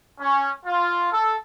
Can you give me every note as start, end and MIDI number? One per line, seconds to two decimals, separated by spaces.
0.20 0.51 61
0.65 1.08 65
1.12 1.36 69